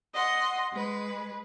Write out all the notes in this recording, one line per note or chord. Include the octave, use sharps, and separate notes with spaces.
D#5 F#5 C6
G#3 B4